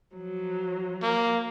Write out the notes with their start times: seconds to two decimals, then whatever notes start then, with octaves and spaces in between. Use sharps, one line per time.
0.15 F3 F#3
1.03 A#3